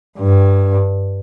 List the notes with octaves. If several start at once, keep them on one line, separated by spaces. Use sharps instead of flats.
G2